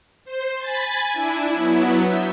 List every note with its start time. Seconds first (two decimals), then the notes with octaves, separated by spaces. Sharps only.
0.25 C5
0.59 G#5 B5 A6
1.14 D4 E4
1.48 F#3 B3
2.02 E5 G6 B6